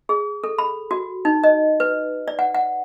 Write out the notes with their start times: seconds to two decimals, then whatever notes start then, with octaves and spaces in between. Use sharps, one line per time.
0.09 G#4
0.44 A4
0.59 B5
0.91 F#4
1.25 D#4
1.44 D#5
1.80 B4
2.28 D5
2.39 F#5
2.55 F#5